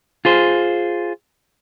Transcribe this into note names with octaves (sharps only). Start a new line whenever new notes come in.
F4 G#4 C5